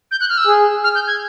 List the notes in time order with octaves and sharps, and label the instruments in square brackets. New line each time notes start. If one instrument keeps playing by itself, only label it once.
[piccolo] G6
F#6
F6
E6
[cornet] G#4
[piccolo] F6
G6
G#6